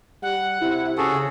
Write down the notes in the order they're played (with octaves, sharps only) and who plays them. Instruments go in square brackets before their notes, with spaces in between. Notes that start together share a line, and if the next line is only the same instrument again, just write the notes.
[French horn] G3 [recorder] F#5
[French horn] C3 [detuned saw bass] E4
[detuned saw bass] C#3 [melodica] F#4 G#4 A4